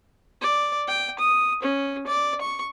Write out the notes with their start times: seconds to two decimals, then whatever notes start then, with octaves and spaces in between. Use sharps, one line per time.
0.41 D5
0.88 G5
1.19 D#6
1.62 C#4
2.07 D5
2.41 C#6